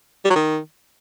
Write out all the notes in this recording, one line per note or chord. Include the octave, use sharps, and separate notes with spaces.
G3
F#3
D#3